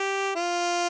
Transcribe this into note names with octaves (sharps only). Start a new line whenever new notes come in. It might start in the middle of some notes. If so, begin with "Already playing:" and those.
Already playing: G4
F4